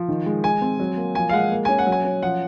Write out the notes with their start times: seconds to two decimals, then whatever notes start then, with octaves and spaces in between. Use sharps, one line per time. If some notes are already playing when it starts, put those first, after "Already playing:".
Already playing: F3
0.08 D#3
0.26 G#3
0.44 G#3 G#5
0.61 C4
0.80 F#3
0.97 A#3
1.15 F3 G#5
1.29 F5
1.33 G#3 F#5
1.52 A#3
1.65 C#4 G#5
1.79 F#5
1.87 F#3
1.92 G#5
2.04 C#4
2.23 F3 F#5